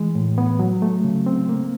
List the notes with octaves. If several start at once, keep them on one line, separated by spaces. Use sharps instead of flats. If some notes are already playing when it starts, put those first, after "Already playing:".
Already playing: E3 G#3
A2
B3
F#3
A3
C#3
C4
A#3